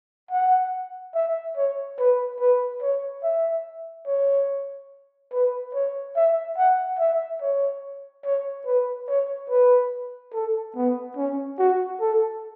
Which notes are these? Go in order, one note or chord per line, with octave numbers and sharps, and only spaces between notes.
F#5
E5
C#5
B4
B4
C#5
E5
C#5
B4
C#5
E5
F#5
E5
C#5
C#5
B4
C#5
B4
A4
B3
C#4
F#4
A4